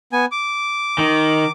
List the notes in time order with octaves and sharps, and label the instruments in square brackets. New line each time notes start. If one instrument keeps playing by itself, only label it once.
[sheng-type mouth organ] B3 G#5
D6
[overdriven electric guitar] D#3